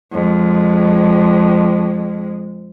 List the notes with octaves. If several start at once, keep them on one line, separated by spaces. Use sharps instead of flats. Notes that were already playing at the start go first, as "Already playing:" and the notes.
F2 G#3